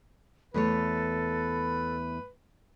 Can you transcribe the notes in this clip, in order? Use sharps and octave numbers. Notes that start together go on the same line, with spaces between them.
E2 A3 A4 B4 C#5